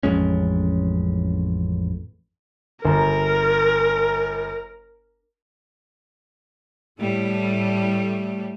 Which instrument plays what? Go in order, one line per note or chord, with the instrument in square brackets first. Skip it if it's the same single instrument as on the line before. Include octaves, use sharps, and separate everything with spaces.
[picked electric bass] A1 F2 G#3 C#4
[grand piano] G1 A#5 [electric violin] A#4
[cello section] A2 G3 A3